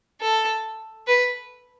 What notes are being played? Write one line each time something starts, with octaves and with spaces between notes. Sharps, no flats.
A4
B4